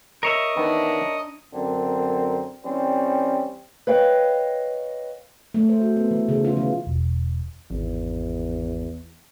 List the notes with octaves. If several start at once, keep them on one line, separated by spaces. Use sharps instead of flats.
A#4 C#5 D#5 E5
D#3 E3 B3 D4
F#2 D3 C4 A#4
E3 G3 C4 C#4
B4 C#5 D#5 F5 G5
A3
C5
F#4
B3
E3
C#3
F4
E3
E1
G#1 E2